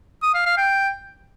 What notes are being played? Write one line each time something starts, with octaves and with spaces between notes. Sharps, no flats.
D#6
F5
F5
G5